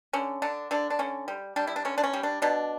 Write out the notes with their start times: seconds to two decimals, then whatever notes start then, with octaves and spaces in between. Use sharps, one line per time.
0.13 D3 C#4
0.42 D3 D4
0.71 D3 D4
0.90 D4
0.99 D3 C#4
1.28 G3
1.56 G3 D4
1.67 E4
1.76 D4
1.85 D3 C#4
1.98 D4
2.04 C#4
2.13 G3
2.23 D4
2.42 B2 D4